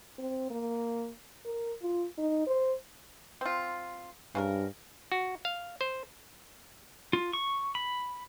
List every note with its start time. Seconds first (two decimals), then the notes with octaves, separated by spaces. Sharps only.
0.18 C4
0.50 A#3
1.45 A#4
1.82 F4
2.18 D#4
2.47 C5
3.41 C4 F4
4.35 G2 C#3 F4 A#4
5.12 F#4
5.45 F5
5.81 C5
7.13 F4
7.33 C#6
7.75 B5